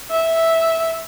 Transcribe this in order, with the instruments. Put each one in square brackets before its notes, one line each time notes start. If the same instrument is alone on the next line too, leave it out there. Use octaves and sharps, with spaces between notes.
[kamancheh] E5